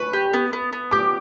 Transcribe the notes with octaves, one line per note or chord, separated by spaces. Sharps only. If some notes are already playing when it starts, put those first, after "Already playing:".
Already playing: B4 B5 C#6
G4
B3
B3
B3
G4 D6